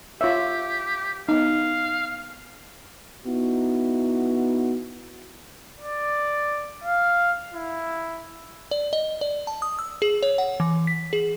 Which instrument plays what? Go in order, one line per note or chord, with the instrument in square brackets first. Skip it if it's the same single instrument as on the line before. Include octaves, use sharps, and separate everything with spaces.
[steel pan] F4 C#5 E5 [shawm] G4
[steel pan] B3 D#4 [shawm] F5
[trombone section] B3 D#4 E4 F#4
[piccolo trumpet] D5
F5
E4
[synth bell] D5
D#5
D5
A5
D#6
E6
G#4
C#5
F#5
E3
B6
G#4